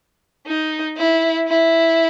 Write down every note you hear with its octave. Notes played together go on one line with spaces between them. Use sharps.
D#4
E4
E4